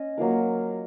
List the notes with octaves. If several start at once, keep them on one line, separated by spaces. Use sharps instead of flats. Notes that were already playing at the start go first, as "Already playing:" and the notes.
Already playing: C#4 D#5
F#3 A#3 F4 A#4